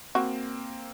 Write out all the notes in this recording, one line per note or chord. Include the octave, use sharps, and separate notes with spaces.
A#3 C4 F#4